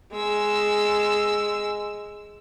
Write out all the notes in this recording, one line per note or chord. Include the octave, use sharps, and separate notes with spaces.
G#3 E6